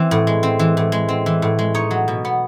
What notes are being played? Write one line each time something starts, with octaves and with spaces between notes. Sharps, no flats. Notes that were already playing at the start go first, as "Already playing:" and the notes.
Already playing: E3 C4
A2
G#3
C4
E3
A2
G#3
C4
E3
A2
G#3
D#4 C#5
F#3
B2
B3